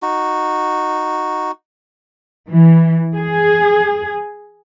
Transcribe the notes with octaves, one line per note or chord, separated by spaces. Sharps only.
D#4 F#4
E3
G#4